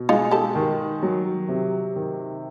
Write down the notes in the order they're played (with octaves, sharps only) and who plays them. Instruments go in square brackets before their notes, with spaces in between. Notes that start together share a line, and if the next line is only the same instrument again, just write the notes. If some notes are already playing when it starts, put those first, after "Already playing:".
Already playing: [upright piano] B2
[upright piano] G#3 [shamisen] D#4 F4
[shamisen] G4 A4
[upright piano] D#3
F#3
C3
D#3